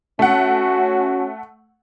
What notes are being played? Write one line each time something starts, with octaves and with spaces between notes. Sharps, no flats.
A3 C#4 F#4 F#5